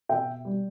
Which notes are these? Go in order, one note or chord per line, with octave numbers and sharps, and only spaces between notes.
B2 E5 G5
G3